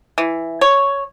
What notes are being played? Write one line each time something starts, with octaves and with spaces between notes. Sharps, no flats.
E3
C#5